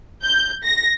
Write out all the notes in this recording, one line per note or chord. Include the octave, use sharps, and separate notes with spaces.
G6
A#6